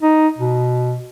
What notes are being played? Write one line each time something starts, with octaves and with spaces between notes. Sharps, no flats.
D#4
B2